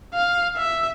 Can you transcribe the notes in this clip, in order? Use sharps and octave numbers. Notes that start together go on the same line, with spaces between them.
F5
E5